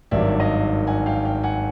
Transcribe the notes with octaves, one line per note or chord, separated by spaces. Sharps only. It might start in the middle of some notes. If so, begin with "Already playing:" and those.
G#1 G2 D#3 F#3 D5 E5
D#5 F5
F#5 G#5
F5 G5
F5 G5
F#5 G#5